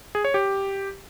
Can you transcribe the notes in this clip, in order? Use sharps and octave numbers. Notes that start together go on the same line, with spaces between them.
G#4
C#5
G4